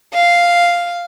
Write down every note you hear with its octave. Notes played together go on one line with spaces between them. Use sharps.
F5